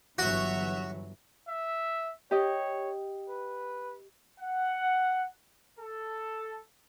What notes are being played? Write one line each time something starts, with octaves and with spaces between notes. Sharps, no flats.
G1 E3 F#3 F#4 C#5 E5
E5
G4 C#5 D#5
B4
F#5
A4